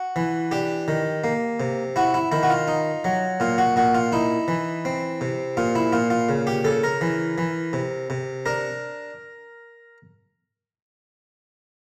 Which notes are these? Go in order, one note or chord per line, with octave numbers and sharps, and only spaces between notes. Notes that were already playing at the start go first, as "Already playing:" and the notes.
Already playing: F#4
E3
D4 G4
D#3
A#3
C3
E4 F#4
E4
D#3 E4
F#4
F4
D#4
F#3
A#2 F4
F#4
A#2 F#4
F4
D#4 E4
E3
C4
C3
A#2 F4
E4
A#2 F4
F4
C#3
G4
C#3 A4
A#4
E3
E3
C3
C3
D4 A#4